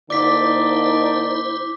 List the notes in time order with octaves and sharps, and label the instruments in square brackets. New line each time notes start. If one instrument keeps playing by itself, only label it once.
[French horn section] D3 A#3 D#4 [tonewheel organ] E4 C5 [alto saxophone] D5 [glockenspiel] D6 B6